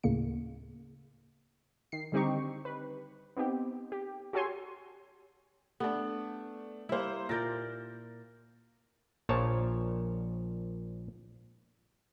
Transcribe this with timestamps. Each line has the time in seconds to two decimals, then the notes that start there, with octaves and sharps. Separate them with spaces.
0.03 D2 A2 C#3 A#3 C#7
1.92 D#3 C7
2.12 D3 G3 C4 D#4 G4 C#6
2.65 B4
3.37 B3 C4 D#4 G4
3.92 G4
4.33 F#4 G4 A4 C#5 G#5 C6
5.80 A3 B3 D4
6.89 G3 A#3 E4 C5
7.29 A#2 A#4 D5 G6 A6 A#6
9.29 A#1 A#2 F3 C#5 A5